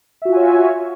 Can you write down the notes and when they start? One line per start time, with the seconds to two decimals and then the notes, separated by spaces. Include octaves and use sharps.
0.22 E5
0.25 F#4
0.29 F4
0.33 G#5
0.36 C#5